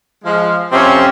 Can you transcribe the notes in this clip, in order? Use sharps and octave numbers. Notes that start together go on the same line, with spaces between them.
F3 G#3
F2 C3 C4 C#4